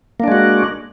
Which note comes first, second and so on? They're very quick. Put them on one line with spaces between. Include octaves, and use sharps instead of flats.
A#3 D4 G#3 F#4